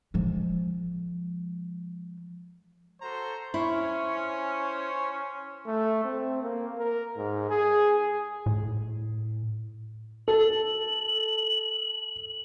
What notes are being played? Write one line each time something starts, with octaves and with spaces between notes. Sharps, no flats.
F3 G#3
F#4 A4 C5 A#5
C#4 E4 C5 C#5
A3
C4
A#3
A#4
G#2
G#4
A2
A4 F#7